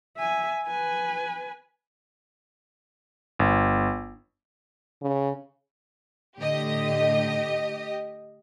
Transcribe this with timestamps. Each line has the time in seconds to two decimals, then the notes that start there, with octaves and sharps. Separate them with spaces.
0.17 E5 G#5
0.67 B4 G#5
3.39 G1
5.02 C#3
6.38 A2 D3 G4 D#5